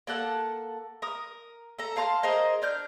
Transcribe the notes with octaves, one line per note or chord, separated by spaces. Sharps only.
A#3 A4 F#5 A5
A#4 D#6
A4 A#5
F5 A5 C6 F6
G#4 A#4 C5 D#5
D4 F6 G6